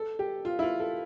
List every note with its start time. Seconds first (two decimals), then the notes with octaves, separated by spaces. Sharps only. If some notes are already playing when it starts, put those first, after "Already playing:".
Already playing: A4
0.19 G4
0.45 F4
0.59 E4
0.63 F4
0.80 A4